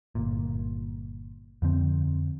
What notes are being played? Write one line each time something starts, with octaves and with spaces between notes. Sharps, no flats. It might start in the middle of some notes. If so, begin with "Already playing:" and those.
G1 A#2
F2 D3 C4